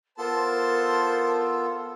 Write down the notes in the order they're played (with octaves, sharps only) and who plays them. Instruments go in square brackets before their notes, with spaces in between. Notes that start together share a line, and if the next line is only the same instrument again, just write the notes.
[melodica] B3 F4 A4 [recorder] A#4 [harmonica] C5 A5